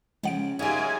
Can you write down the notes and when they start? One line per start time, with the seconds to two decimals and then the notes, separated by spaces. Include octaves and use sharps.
0.23 C#3 F3 G#3 F#5 D7
0.59 F#2 C#3 D#4 G4 G#5